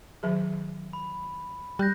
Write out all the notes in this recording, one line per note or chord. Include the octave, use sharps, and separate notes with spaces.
D#3 F#3 G#4
B5
G3 F#6 G6 A#6